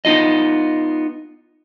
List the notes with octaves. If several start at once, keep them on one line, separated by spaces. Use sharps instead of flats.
B3 D#4 F4 D#5